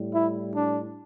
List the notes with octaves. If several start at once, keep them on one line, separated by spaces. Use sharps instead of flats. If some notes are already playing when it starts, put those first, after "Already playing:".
Already playing: A2 G3
E4
D4